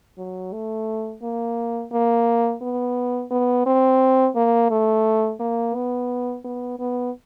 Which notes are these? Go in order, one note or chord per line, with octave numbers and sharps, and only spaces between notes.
F#3
A3
A#3
A#3
B3
B3
C4
A#3
A3
A#3
B3
B3
B3